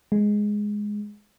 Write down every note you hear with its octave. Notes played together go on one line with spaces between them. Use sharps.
G#3